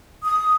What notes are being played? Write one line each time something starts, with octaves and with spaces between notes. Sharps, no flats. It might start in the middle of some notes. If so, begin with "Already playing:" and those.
D#6